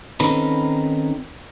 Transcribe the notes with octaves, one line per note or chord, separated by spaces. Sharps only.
D#3 C4 C#4 D#4 A4 B4